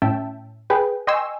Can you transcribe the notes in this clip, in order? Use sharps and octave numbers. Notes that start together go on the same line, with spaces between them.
A2 C#4 E5 G5 A5
G#4 B4 G5
D#5 G5 G#5 C6 C#6 E6